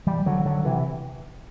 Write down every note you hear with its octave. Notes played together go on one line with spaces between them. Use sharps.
E3 G3
D3 F#3
D3 F#3
C3 E3